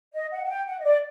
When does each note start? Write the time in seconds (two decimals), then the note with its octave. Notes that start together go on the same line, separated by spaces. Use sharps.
0.14 D#5
0.32 F#5
0.44 F#5
0.49 G5
0.67 F#5
0.80 D#5
0.84 D5